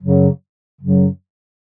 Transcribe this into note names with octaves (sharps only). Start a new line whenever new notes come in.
F#2 C#3 F#3
F#2 C#3 F#3